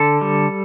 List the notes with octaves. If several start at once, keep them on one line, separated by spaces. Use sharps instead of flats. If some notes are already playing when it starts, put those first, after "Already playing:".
Already playing: D3 A4
G3